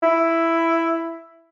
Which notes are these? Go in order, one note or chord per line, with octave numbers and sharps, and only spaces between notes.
E4